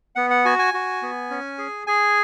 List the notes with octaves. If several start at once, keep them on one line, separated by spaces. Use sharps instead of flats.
B3 F#5
F#5
F#4 G#5
G#5
F#4
B3
C#4
G#4
G#4 G#5